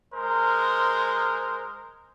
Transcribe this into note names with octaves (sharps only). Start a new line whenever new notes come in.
G#3 A#4 C5